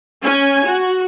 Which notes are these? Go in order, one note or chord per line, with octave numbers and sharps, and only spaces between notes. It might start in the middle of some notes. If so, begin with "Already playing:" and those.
C#4 G#5
F#4